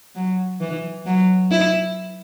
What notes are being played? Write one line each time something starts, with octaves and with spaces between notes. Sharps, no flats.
F#3
E3
F#3
E4